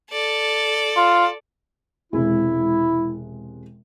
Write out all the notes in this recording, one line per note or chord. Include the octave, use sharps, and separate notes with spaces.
A4 D5
F4
E1 C3 G#3 E4